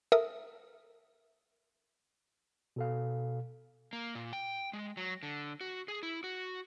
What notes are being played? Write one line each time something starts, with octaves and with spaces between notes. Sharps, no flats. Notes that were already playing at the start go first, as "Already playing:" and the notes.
A4 A#4 E5 D#6
B2 A4 F5
A#3
A#2
G5
G#3
F#3
D3
F#4
G#4
E4
F#4